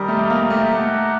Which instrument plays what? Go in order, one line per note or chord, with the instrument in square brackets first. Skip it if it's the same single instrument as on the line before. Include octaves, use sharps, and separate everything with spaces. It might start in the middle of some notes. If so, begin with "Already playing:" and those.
Already playing: [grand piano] D#3 G3 [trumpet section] C4 G4 A#4 D#5
[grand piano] A3
A#3
A3
[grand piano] A3 [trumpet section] D#4 G4 A#4 F#5